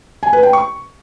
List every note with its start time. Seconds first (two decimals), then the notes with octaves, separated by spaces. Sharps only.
0.23 G#5
0.33 B4
0.43 G5
0.53 C#6